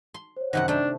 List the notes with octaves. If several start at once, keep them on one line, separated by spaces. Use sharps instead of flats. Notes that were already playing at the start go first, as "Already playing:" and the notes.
C6
C5 C#5
F#2 C3 D#3 C5 F#5
A3 D4 G5